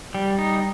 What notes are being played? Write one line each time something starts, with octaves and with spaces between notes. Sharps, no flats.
G3
D#4